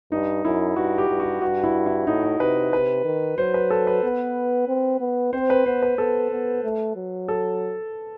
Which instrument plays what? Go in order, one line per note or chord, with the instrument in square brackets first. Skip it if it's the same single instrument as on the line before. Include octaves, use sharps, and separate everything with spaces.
[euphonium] G2 [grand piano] D#4
[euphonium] F#2 [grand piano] E4
[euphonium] G2 [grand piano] F#4
[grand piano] G4
[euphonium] G2
[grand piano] F#4
[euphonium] G2 [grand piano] F#4
[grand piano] E4
E4
[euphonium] A2 [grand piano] D#4
[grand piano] D#4
[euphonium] C3 [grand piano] B4
[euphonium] C3 [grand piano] B4
[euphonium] D#3
[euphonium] F#3 [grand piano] C5
[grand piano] B4
A4
B4
[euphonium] B3
C4
B3
[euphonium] C4 [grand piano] C5
[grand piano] B4
[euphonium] B3 [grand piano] C5
[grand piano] B4
[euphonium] B3 [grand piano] A4
[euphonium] B3
A3
F#3
[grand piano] A4